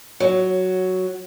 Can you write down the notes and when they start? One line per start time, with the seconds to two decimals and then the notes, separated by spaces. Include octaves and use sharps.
0.20 F#3